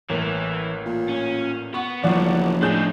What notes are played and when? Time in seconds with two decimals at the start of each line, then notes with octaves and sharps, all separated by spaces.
0.10 A1 E3 A#3
0.86 A#2
1.08 C#4
1.74 B3 F#5 C#6
2.04 F#1 E2 C#3 F3 C#5 D5 F#5
2.62 A2 D4 D#4 G#4 G6